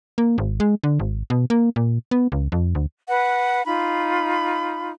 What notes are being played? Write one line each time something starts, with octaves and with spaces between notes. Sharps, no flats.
A#3
G#1
G#3
D3
G#1
B2
A#3
A#2
B3
C#2
F2
D2
B4 F#5
D#4 F4 B5